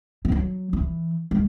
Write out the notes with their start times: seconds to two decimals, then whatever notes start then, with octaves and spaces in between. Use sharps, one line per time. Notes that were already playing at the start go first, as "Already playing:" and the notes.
0.25 E3
0.32 F#3
0.73 E3
1.31 G#3